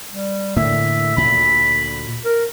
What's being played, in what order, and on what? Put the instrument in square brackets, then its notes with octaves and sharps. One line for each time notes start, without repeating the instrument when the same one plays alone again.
[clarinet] G3
[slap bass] A2 D3 A#3 [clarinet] E5
[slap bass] D2 A#2 [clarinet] B5
[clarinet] A#4